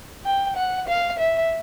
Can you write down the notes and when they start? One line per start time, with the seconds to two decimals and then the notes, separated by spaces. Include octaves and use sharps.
0.25 G5
0.57 F#5
0.88 F5
1.19 E5